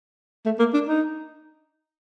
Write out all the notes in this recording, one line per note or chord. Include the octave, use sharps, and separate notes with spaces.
A3
A#3
D4
D#4